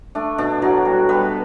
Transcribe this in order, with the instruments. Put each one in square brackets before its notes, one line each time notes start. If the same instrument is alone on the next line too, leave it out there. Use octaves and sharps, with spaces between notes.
[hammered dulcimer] A3 D4
B2 D4
A2 F#3 F#4
G3
G3 B3 B4